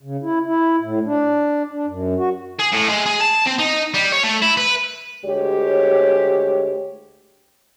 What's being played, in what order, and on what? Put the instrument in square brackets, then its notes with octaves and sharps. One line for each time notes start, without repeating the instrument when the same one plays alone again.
[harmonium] C#3
E4
E4
A2
D4
D4
F#2
F#4
[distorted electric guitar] G#4
A2
G#3
G#4
A5
C4
D#4
G3
C#5
A3
E4
B4
[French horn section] D2 G#3 G4 C#5